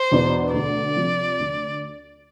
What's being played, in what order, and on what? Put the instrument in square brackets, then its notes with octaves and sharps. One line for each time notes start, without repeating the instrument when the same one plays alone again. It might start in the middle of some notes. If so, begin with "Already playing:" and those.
Already playing: [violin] C5
[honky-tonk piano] E2 B2 B3 D4
[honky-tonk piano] D2 [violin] D5
[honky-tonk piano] C3 F3
D2